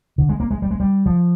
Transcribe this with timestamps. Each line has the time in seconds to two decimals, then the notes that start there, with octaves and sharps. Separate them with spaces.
0.18 D3
0.29 G#3
0.40 A#3
0.51 G#3
0.62 G3
0.71 G#3
0.80 G3
1.06 F3